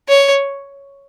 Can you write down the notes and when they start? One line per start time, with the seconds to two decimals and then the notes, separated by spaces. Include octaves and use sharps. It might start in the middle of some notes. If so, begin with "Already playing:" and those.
0.09 C#5